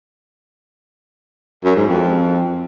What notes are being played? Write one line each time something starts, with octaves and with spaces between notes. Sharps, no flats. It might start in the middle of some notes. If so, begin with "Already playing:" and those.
F#2
G#2
F2